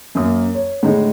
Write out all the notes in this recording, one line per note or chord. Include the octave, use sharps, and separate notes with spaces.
F#2 A#3 D#6
C#5
A2 D3 G#3 D#4